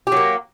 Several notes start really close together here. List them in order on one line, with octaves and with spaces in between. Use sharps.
G4 F#3 A#3